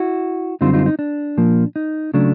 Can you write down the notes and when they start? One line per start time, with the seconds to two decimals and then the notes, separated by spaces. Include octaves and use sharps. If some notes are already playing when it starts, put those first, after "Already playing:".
Already playing: E4 F#4
0.61 F#2 D3 G3 C4 D#4 F4
0.73 D#4 F4
0.86 D#4
0.99 D4
1.38 A#2 F3 A#3
1.76 D#4
2.14 C#3 F#3 A3 D4